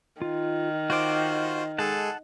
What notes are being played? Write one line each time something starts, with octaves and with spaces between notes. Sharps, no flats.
D#3 F4
F4 F#4 C5 G5 D6
G#3 G#4 A4 F#5 A5